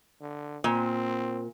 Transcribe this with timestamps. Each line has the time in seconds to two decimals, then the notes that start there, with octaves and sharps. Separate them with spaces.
0.22 D3
0.64 A#2 C4